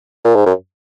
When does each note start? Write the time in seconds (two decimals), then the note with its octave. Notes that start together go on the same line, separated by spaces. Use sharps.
0.25 A#2
0.36 G#2
0.46 F#2